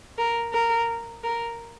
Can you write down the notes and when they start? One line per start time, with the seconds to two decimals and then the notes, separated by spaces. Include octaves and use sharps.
0.18 A#4
0.53 A#4
1.24 A#4